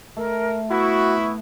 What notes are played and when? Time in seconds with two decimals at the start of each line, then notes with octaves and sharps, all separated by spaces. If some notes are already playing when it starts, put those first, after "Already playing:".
0.17 A3 A#4
0.71 B3 E4 F#4 C#6